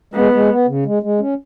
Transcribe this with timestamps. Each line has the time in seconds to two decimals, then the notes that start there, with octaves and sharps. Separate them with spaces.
0.14 G#3 B3
0.32 G#3
0.49 B3
0.67 C#3
0.85 G#3
1.03 G#3
1.20 C#4